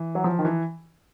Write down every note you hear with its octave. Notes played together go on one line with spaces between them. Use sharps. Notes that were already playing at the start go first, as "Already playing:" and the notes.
Already playing: E3
F#3
F3
D#3
E3